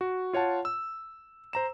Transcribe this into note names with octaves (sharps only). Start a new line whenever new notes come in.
F#4
F4 C#5 F#5 A5
E6
C5 A#5 E7